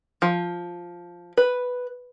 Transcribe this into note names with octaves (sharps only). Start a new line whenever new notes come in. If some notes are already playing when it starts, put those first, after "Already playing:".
F3
B4